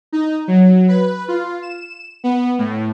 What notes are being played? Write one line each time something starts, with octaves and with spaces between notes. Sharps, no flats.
D#4
F#3
B4
F4
E7
B3
A2